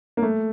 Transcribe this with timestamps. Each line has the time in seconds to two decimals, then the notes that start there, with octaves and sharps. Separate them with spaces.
0.17 A#3
0.22 A3